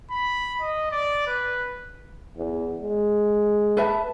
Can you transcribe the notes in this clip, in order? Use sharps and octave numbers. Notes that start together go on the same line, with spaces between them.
B5
D#5
D5
B4
E2
G#3
B4 E5 A5